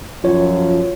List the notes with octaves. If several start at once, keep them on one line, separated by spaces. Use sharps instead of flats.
F#2 F3 F4 C#5